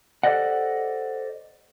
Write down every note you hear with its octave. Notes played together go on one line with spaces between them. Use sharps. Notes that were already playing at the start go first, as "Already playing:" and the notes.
G4 A4 C5 D5 D#5 F#5